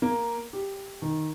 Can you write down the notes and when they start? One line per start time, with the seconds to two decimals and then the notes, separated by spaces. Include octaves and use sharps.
0.02 A#3
0.53 G4
1.02 D#3